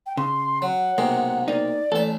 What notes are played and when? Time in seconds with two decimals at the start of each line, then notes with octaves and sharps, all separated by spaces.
0.06 G5
0.17 C#3 C6
0.62 F#3 F#5
0.98 B1 C3 G#3 A#3
1.48 A#3 D#4 D5
1.92 A1 A4 E5